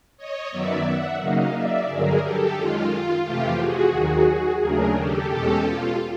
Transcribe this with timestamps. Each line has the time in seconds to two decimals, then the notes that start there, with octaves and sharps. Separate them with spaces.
0.17 C#5 D#5
0.51 F#2 D#3 F#3 B3 D5 E5
0.85 E5 F#5
1.19 C#3 F#3 A#3 D#4 D#5 F5
1.54 D5 E5
1.88 G2 D3 F#3 G#4 A#4
2.21 G4 A4
2.56 F#2 D#3 G#3 F4
2.90 F4
3.24 F2 C3 E3 A3 F4 G4
3.58 F#4 G#4
3.92 D#2 D#3 F#3
4.60 D#2 C#3 F#3 A3 D4 G#4 A#4
4.95 G4 A4
5.28 E2 B2 G#3 C#4 G4 A4
5.63 F4